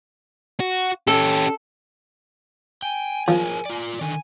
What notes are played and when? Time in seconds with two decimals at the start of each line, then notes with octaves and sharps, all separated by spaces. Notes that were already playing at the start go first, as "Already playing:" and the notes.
0.60 F#4
1.07 C#4 G4 A4
2.82 G5 G#5
3.28 F3 G#4 A#4 C#5
3.66 F4 D5
4.01 D3 D#3 G#5